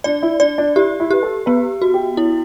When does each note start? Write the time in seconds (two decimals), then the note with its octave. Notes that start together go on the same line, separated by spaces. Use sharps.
0.04 D4 D5
0.23 E4
0.40 D4 D5
0.58 D4
0.76 E4 G4
1.00 E4
1.11 G4 B4
1.23 A4
1.46 B3 B4
1.82 F#4
1.94 G4
2.17 E4